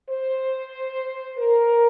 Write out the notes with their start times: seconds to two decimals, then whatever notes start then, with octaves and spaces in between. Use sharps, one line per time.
0.10 C5
1.39 A#4